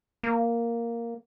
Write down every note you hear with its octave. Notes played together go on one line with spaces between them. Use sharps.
A#3